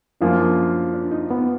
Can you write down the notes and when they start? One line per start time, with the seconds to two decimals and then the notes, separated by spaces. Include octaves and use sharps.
0.21 F#2 F3 A#3 D4 F4
0.94 D4
1.11 D#4
1.30 B3